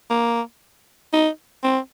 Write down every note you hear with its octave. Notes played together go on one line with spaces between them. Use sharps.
A#3
D#4
C4